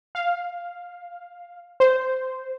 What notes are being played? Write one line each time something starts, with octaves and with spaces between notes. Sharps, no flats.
F5
C5